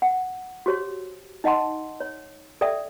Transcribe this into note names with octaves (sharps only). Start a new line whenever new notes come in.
F#5
F#4 G4 C5 C#5
D#4 D#5 F#5 A5 C6
C#5
A4 D5 E5 G5 D#6